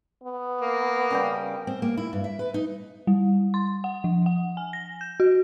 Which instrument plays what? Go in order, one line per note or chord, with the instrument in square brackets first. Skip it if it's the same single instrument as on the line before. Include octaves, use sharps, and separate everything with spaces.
[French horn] B3
[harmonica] A#3
[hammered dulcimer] C#3 G3 G5
[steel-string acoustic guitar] C4
A#3
E4
G2
E5
B4
D#4
[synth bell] G3
C6
F#5
F3
F#5
G#5
A#6
G6
F#4